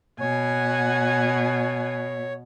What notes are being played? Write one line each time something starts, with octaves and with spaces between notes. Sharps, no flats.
B2 C#5 F#5 G#5